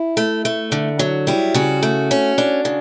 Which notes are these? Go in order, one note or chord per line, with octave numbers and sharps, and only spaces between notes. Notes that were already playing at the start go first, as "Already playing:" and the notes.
Already playing: E4
A3
A3
D3
F#3
G3 E4
C#3 F#4
A3
C#4
D4
C#3